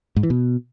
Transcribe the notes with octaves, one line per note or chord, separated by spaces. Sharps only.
G#2
E3
B2